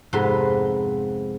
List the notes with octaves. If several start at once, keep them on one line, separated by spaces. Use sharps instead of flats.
F2 G#2 C3 B3 B4 C6